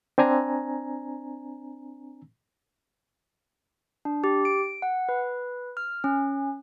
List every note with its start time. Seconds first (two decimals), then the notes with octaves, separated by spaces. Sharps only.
0.18 C4 D4 G#5 A#5
4.05 D4
4.24 G4
4.45 D7
4.82 F#5
5.09 B4
5.77 F6
6.04 C#4